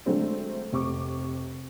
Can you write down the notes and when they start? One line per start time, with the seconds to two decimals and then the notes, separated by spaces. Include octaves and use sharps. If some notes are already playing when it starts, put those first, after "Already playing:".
0.06 D3 F#3 G#3 A3 C4 D4
0.73 F1 C3 C#6 D6